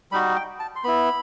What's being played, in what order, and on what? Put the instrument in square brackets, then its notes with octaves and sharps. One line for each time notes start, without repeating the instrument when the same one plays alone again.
[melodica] G3 D#4 F#4 B5
G5
A5
C6
B3 E4 B5